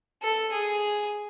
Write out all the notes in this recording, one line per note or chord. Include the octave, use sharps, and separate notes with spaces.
A4
G#4